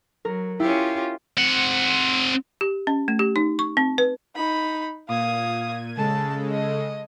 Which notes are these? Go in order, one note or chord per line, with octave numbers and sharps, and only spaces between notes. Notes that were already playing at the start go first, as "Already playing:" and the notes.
F#3 A#4
C#4 E4 F4 G4
C4 F#5
G4
C#4
A3
G4
D#4
C#6
C4
B4
D#4 B5
A#2 F5 D#6 G#6 D#7
C#3 G#3 A4 A5
D#5